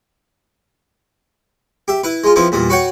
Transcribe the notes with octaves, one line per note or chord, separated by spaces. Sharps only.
G4 E5
E4 B4
G#3 F4
F3 B3 C4 E4
E2 A#2 G3
F#4 B4 C#5 F#5 G5